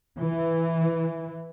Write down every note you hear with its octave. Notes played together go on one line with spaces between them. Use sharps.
E3